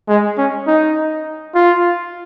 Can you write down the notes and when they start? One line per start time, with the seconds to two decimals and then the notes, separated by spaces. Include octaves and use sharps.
0.08 G#3
0.38 C#4
0.67 D#4
1.55 F4